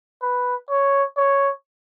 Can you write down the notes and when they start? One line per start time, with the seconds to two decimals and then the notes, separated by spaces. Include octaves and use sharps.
0.22 B4
0.70 C#5
1.17 C#5